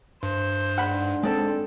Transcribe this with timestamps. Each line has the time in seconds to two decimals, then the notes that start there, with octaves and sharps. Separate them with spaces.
0.23 G2 C5
0.78 G#2 D4 F#5 B5
1.23 G#3 C4 A4 D5